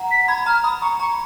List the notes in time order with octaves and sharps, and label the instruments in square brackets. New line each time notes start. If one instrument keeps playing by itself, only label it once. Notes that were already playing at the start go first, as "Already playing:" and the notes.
Already playing: [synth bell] F#5 A#5
[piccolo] B6
[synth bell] B5 [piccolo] G#6
[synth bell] A#5 [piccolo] F6
[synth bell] B5 [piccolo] D#6
[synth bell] A#5 [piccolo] C#6
[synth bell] A#5 [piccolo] C#6